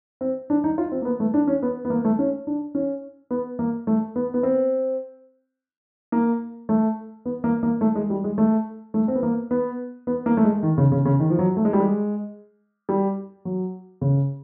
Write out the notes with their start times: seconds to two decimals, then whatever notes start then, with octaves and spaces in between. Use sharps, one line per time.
0.21 C4
0.50 D4
0.64 D#4
0.78 F4
0.92 C4
1.02 A#3
1.05 B3
1.20 A3
1.34 D4
1.47 C#4
1.62 B3
1.85 B3
1.90 A#3
2.05 A3
2.19 C#4
2.47 D4
2.75 C#4
3.31 B3
3.59 A#3
3.87 A3
4.16 B3
4.34 B3
4.43 C4
6.12 A#3
6.69 A3
7.26 B3
7.44 A#3
7.63 A#3
7.81 A3
7.95 G#3
8.10 G3
8.24 G#3
8.38 A3
8.94 A3
9.08 C4
9.15 B3
9.23 A#3
9.51 B3
10.07 B3
10.26 A#3
10.37 A3
10.44 G#3
10.63 D#3
10.78 C#3
10.92 C#3
11.05 C#3
11.20 D#3
11.30 F3
11.39 F#3
11.57 A3
11.65 G#3
11.73 G3
11.80 G#3
12.89 G3
13.45 F#3
14.01 C#3